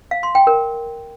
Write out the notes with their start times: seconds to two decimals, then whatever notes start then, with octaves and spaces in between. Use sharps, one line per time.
0.11 F5
0.23 C6
0.35 G5
0.47 A#4